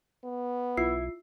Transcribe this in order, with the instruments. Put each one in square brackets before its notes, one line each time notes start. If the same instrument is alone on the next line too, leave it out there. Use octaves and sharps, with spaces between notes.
[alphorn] B3
[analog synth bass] B1 [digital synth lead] E4 [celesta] F4 C7